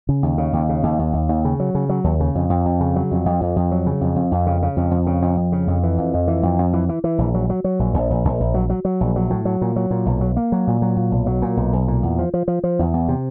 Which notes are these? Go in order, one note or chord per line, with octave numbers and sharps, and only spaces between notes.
C#3
D#2
C#3
D#2
C#3
D#2
D#2
D#2
D#2
C#3
F#3
C#3
F#3
D#2
C#3
F2
F2
F2
C#3
F#3
F2
F2
F2
F2
F#3
C#3
F2
F2
F2
C#3
C#3
F2
F2
C#3
F2
F2
C#3
F2
E3
F2
F2
E3
F2
F2
E3
E3
E3
A#1
F#3
F#3
F#3
A#1
A#1
A#1
A#1
A#1
F#3
F#3
F#3
A#1
F#3
A2
F#3
A#2
F#3
A#2
B1
F#3
A#3
F#3
A#2
F#3
A#2
B1
F#3
A#2
B1
B1
A#2
E2
F3
F3
F3
F3
E2
E2
C3